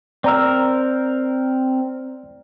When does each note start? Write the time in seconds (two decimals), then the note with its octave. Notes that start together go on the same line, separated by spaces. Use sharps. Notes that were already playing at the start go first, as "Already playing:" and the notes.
0.24 C4 A#4 D5 A#5 E6